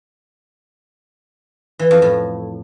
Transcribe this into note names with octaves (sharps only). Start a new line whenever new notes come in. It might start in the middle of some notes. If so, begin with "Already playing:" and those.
E3
F2
A2